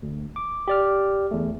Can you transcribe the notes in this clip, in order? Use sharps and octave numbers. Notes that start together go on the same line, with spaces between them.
D2
D6
G4 D5 F6
E2 A3